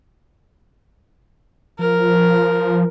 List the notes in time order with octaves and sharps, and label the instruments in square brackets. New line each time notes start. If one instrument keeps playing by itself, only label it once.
[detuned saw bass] F3 [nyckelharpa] A#4